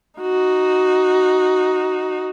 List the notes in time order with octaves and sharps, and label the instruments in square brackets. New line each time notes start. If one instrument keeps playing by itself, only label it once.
[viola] D#4 F#4